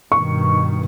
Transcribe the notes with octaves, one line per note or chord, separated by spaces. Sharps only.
G2 B2 D#3 C#6